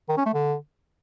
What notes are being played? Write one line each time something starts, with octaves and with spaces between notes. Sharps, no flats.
D#3
C#4
A3
D3